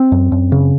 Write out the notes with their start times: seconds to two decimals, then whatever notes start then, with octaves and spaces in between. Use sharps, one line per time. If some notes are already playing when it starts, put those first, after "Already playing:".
Already playing: C4
0.12 F#2
0.32 F#2
0.52 C#3